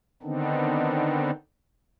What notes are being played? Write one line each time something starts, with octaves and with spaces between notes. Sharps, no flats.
D3 D#3 B3 C4 D4 D#4